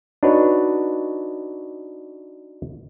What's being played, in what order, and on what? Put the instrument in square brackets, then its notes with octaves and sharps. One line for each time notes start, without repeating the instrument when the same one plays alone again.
[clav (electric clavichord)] D4 D#4 F#4 B4 C#5